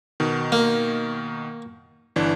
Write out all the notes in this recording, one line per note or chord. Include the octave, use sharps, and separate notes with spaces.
B2 D#3
A#3
G1 E3 D4